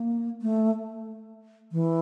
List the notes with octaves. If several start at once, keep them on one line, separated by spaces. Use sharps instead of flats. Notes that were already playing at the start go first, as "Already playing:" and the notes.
Already playing: A#3
A3
E3